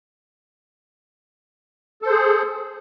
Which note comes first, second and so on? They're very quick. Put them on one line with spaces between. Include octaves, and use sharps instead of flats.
A4 C5 G#4